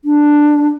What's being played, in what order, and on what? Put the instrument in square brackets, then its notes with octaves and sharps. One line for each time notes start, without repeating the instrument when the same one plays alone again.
[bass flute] D4